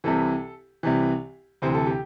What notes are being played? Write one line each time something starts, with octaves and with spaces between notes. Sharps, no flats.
C2 C3 E3 A4
C2 C3 E3
D2 C3 E3 C5
A4
G4